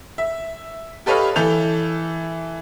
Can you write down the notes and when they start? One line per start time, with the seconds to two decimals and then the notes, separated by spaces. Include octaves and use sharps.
0.18 E5
1.06 G4 A4 B4 C#5 D#5 F5
1.36 E3 A4 G6 F7